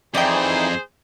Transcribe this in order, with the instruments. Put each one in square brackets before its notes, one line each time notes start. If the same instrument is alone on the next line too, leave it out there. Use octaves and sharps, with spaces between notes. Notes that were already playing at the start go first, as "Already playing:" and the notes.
[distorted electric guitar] F2 [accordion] E3 D#4 E4 [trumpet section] G#4 C5 [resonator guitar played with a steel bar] D5 G5